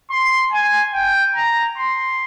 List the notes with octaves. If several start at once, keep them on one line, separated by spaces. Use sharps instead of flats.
C6
G#5
G5
A#5
C6